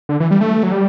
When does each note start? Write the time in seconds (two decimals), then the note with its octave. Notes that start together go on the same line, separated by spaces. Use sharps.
0.09 D3
0.20 E3
0.31 G3
0.41 A3
0.63 F#3
0.72 G3